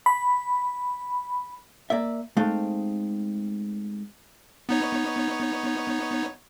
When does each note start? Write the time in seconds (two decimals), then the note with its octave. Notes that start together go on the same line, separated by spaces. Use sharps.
0.06 B5
1.90 A#3 D5 E5
2.37 G#3 A3 C4 D#4 F5
4.69 B3 D#4 C#5